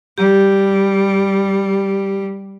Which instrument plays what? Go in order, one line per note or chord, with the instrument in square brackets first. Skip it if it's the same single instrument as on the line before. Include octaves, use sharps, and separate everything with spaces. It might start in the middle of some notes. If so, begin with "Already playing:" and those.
[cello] G3 [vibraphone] G4